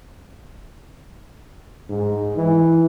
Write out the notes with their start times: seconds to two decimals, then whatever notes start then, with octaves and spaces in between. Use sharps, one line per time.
1.90 G#2
2.37 E3